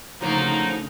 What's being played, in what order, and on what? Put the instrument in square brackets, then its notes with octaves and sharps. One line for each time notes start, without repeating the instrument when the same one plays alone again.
[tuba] D2 [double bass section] C#3 [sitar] F3 F#3 A#3 [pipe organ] D#4